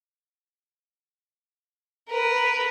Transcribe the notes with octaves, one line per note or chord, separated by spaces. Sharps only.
A#4 B4